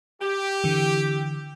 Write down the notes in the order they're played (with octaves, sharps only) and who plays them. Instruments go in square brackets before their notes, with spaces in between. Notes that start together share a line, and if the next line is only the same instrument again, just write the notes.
[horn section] G4
[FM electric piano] D3 E3